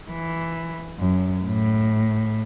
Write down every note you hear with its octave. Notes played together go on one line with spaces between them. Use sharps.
E3
F#2
A2